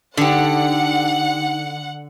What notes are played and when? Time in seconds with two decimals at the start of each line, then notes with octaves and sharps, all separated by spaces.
0.17 D3 D4 D#4 G4 F#5